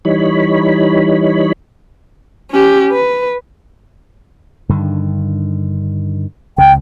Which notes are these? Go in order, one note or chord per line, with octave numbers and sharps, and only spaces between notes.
E3 G3 D#4 C#5 B5
C#4 G4
B4
G2 D3 D#3
C#2 C#3 G5